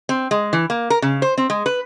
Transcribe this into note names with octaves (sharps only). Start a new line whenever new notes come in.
C4
G#3
E3
A#3
A#4
C#3
C5
C4
G#3
B4